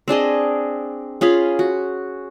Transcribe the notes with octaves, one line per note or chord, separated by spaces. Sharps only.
C4 D4 G#4 D#5
C#4 F4 G#4 B5
F#4